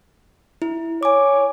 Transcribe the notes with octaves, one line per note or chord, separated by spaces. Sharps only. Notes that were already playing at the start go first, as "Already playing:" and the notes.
E4
C#5 G#5 D6